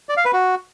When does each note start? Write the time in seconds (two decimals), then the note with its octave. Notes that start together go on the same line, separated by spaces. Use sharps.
0.09 D5
0.17 F5
0.25 B4
0.33 F#4